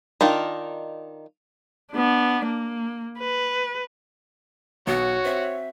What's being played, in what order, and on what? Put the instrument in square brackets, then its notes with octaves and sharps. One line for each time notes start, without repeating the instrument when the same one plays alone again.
[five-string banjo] D#3 D4 D#4 F4
[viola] B3 D4
A#3
B4
[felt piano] B1 [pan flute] B3 [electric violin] F#4 [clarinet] C#5
[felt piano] C4 [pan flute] E5